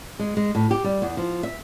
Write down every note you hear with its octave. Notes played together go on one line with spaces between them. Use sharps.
G#3
G#3
A2
G4
G3
E2
F3
E5